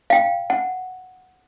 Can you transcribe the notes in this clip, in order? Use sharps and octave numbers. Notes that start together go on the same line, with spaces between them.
F5 G5
F#5